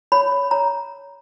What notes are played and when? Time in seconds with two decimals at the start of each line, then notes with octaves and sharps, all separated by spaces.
0.12 C#5 B5
0.32 C#5
0.51 C#5 A#5